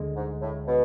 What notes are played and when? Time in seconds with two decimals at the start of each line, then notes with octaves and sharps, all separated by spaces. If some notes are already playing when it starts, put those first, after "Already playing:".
Already playing: D2 D3 G#3
0.16 G#2
0.42 A2
0.67 B2